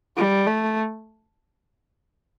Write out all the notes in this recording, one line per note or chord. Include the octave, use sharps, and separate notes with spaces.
G3
A3